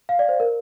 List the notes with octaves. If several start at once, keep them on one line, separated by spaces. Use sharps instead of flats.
F5
D5
C5
A#4